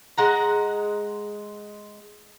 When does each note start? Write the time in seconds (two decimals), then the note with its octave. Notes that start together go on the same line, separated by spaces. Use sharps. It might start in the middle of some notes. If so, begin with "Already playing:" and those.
0.18 G#3 F#5 A#5